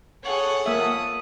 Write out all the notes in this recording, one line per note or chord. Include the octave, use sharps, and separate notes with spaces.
G#4 A4 C#5 F#5
A#3 E5 D#6